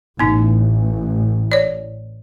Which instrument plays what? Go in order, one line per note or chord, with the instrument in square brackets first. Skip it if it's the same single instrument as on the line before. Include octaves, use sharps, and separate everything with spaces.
[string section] A1 [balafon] B3 D#4
[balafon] C#5 D5